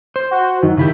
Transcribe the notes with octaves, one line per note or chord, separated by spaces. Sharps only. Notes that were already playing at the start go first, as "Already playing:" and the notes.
C5
F#4
F#2 D#3
C#3 E4 G4